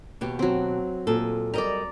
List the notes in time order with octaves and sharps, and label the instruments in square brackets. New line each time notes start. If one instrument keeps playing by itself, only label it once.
[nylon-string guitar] D#2 B2 G4
[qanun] F#3 C4
[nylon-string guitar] A#2 G#4 A4
[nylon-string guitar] G3 A#4 D#5 [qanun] D5 A#5